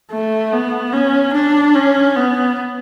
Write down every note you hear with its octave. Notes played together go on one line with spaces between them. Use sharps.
A3
B3
C#4
D4
C#4
B3